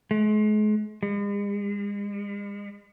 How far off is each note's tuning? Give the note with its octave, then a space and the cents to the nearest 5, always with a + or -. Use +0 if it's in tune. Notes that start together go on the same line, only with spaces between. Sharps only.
G#3 +40
G#3 -40